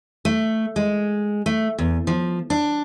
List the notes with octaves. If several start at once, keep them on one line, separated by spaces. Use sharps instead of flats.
A3
G#3
A3
E2
F3
D4